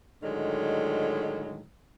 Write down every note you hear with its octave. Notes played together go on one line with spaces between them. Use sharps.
A2 D3 D#3 F#3 G#3